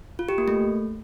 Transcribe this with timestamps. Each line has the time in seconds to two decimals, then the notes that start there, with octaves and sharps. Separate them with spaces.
0.19 F4
0.29 G4
0.38 A#3
0.48 A3